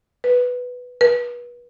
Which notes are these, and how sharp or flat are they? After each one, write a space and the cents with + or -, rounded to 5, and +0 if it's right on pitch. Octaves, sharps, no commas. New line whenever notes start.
B4 +5
B4 -35